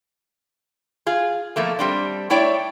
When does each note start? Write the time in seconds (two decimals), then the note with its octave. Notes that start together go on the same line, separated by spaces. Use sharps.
1.06 F4 G#4
1.56 B2 F3 A3 A#3
1.79 G3 C4 D4
2.30 A3 D4 E4 C#5 D5 G5